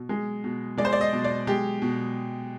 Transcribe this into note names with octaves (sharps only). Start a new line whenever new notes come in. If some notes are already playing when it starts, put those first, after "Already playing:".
Already playing: B2
G#3
B2
G#3 D5
C5
D5
D#5
B2
D5
G#3 G4
B2